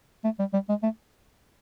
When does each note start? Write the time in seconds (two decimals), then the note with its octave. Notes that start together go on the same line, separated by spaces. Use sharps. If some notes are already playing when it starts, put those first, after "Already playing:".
0.24 A3
0.39 G3
0.53 G3
0.69 G#3
0.83 A3